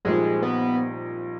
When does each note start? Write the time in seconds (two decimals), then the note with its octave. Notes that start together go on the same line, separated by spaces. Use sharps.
0.05 A#1 A#2 G3 G#3 C4 D#4
0.42 B3